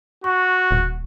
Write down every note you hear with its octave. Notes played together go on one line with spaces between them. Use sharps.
F#4 C#6
D#1